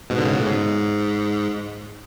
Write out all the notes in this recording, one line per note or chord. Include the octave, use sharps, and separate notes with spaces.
G#2 B2
D3
C#3
B2
A2
G#2